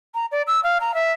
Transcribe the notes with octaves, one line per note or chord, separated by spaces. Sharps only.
A#5
D5
E6
F5
A#5
E5